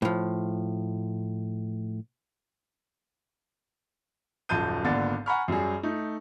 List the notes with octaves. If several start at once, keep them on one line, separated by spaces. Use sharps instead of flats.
A2 F3
D#1 F#2 F3 A5 G6 D#7
G#1 A#2 D3 B3 A6
F#5 G#5 A#5 B5 C#6 F6
F#2 F#3 G3 G#4
A3 D#4